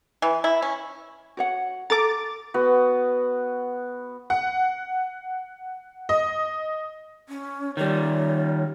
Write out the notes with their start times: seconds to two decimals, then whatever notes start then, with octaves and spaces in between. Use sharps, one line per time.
0.22 E3
0.44 E4
0.62 C#4
1.37 F#4 C#5 F#5
1.90 A4 A#5 D6 A6
2.54 B3 F#4
4.30 F#5
6.09 D#5
7.29 C#4
7.77 D#3 G3 C#5